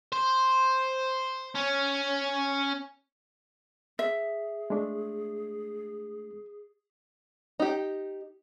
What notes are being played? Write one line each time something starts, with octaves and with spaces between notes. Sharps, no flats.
C5
C#4
G#4 E5
G#3 A3 D4
D#4 G4